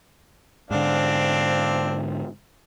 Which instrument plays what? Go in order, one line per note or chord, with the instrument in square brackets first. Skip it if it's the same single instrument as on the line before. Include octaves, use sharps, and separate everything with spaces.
[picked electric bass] G#2 D3 [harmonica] C4 D4 F5